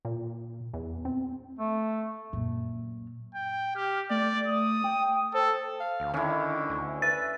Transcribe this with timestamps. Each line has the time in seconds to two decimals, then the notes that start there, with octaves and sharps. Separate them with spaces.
0.05 A#2
0.74 E2
1.05 C4
1.59 A3
2.33 F#2 A#2
3.35 G5
3.75 G4 F6
4.10 A3 D5
4.46 D#6
4.84 G5
5.34 A4 C5
5.80 F5
6.00 D2
6.14 D3 D#3 C#4 E4
6.69 D2
7.02 B4 E5 A6